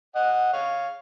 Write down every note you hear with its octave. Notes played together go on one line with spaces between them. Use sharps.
D#5 F#5
C#5 F5